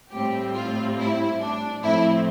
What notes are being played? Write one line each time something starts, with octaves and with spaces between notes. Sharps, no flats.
A2 G3 C4 G4
F4
E4
D4
A2 F3 A3 C4 E4